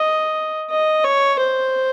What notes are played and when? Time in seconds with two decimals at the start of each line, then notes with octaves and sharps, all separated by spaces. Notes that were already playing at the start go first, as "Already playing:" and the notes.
Already playing: D#5
0.70 D#5
1.04 C#5
1.39 C5